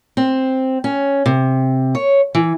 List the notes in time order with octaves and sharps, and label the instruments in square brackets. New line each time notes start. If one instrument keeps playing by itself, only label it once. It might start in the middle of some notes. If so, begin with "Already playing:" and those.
[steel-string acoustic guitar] C4
C#4
C3
C#5
E3